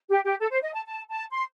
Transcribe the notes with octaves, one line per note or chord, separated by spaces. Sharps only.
G4
G4
A4
C5
D#5
A5
A5
A5
C6